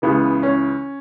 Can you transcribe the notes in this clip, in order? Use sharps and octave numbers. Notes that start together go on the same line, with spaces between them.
C#2 C#3 E3 B3
C#4